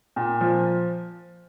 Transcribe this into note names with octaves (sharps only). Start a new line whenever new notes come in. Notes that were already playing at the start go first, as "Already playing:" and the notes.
A#2
F3